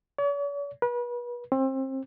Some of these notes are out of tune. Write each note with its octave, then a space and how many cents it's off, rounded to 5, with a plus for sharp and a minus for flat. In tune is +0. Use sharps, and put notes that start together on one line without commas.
C#5 +45
B4 -35
C4 +30